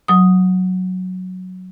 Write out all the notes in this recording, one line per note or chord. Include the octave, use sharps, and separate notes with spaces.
F#3 D#6